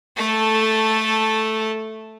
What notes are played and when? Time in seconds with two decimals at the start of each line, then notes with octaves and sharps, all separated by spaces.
0.17 A3 A4